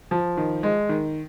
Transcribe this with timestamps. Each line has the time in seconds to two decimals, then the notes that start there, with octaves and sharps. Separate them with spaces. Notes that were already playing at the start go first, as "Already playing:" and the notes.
0.11 F3
0.37 D#3
0.63 G#3
0.89 D#3